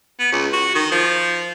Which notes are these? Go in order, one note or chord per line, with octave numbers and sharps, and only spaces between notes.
B3
C#2
F#4
D#3
F3